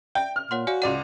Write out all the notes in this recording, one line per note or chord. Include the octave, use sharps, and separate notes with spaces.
D5 E5 G5
F6
A#2 C#5 F#5 C6
F#4 D5 F5 G#5
C#2 D5 F#5 C6 D#7